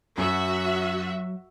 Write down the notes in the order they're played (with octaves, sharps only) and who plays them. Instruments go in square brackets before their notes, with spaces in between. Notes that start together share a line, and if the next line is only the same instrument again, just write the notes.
[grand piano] F#2 [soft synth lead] F#3 [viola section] F#4 E5